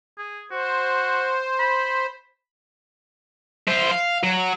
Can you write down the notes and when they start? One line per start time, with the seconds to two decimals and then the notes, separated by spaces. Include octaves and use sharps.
0.18 G#4
0.51 F#4 C5
1.59 B5
3.68 E4 C5
3.91 F5
4.24 F#3